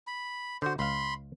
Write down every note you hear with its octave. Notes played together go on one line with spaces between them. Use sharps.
B5
D3 F#4 C5
C#2 F5 B5 C6